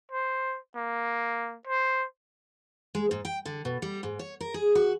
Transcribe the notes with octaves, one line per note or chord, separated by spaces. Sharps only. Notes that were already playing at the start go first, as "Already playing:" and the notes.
C5
A#3
C5
G#3
G#2
G5
D3
B2
G3
G#2
C#5
A#4
G#4
F#4